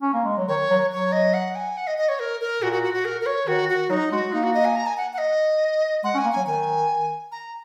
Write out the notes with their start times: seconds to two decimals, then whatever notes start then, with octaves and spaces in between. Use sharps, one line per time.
0.02 C#4
0.14 A#3
0.25 G#3
0.37 F#3
0.48 D#3 C#5
0.70 F#3
0.91 F#3 C#5
1.12 D#5
1.34 F#5
1.55 G#5
1.77 F#5
1.87 D#5
1.98 D#5
2.09 C#5
2.20 A#4
2.41 A#4
2.62 A#2 F#4
2.73 F#4
2.83 F#4
2.94 F#4
3.05 A#4
3.21 A#4
3.26 C#5
3.47 D#3 F#4
3.69 F#4
3.90 F#3 D#4
4.12 G#3 F#4
4.33 A#3 D#4
4.44 F#4
4.54 D#5
4.65 G#5
4.76 A#5
4.87 G#5
4.97 F#5
5.13 F#5
5.18 D#5
6.04 G#3 F#5
6.14 C#4
6.18 G#5
6.25 A#3
6.32 F#3 G#5
6.47 D#3 G#5
7.32 A#5